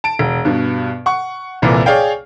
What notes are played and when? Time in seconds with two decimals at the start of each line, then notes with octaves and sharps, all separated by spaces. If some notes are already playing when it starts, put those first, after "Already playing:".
0.04 A5 D7
0.19 E1
0.45 G2 B2
1.06 F#5 C#6
1.62 F1 C2 A#2 E3
1.86 G#4 C#5 D5 F5 G5